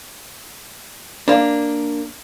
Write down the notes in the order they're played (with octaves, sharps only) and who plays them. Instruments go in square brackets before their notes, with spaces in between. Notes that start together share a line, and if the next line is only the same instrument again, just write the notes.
[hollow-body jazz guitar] A#3 D4